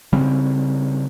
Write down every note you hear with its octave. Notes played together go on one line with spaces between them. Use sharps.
C#3 G3 C4